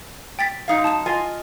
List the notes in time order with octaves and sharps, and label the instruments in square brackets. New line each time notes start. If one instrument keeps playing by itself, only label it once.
[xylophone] G5 A6 B6
[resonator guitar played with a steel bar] F#2 D#4 F5
[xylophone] A5 D#6 E7
[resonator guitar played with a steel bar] F4 D#5 G#5